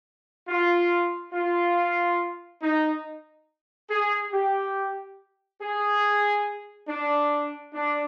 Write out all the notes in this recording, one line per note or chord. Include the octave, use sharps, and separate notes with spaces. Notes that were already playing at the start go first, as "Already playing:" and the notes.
F4
F4
D#4
G#4
G4
G#4
D4
D4